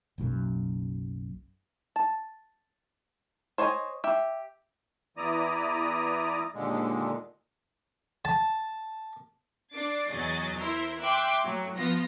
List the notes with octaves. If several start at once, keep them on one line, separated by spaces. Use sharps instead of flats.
F#1 B1 F#2 F#3
A5
C5 C#5 D#5 G#5
G4 E5
E2 E3 E4 D5 A#5 D#6
D#2 A#2 D3 G#3
A5
D4 D6 A6 C7
E2 F#3 G#4 D#5 A6
E4 A#4 C5 C6
E5 G5 C6 D6 F#6
A2 F#3
F3 B3 F4 A#6